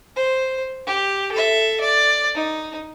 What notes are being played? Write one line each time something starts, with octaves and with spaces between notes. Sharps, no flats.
C5
G4
A4 E5
D5
D#4